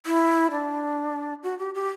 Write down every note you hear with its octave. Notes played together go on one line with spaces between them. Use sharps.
E4
D4
F#4
G4
G4